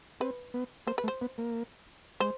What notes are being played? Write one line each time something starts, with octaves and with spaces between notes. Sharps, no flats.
C4 B4
B3
A#3 C5
B4
A3
C5
B3
A#3
G#3 C5